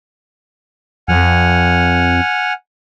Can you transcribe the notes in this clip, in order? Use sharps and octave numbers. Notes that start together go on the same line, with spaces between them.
F2 F#5 G#5 F6